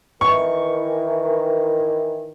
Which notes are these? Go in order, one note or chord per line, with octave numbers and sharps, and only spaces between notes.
D#3 E3 C#6